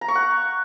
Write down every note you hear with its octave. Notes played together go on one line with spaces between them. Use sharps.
A#5
C#6
F#5